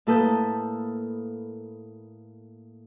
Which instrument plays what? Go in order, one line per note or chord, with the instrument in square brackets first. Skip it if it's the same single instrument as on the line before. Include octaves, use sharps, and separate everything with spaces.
[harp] A2 A#3 A4 B4 D#6 G6